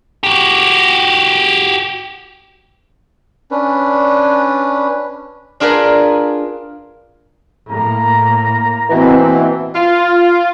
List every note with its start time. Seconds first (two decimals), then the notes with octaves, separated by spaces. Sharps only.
0.23 F#4 G4
3.51 C#4 D4 B4
5.60 D4 F4 G#4 A#4 B4
7.69 A2 A#3 A#5
8.90 B2 E3 A#3 C4
9.75 F4